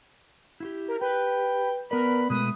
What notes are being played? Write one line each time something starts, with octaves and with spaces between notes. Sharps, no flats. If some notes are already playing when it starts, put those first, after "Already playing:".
E4 F4 G4
A#4
G4 B4 G5
B3 A#4 B4 D5 B5
B2 G#3 A3 B4 D#6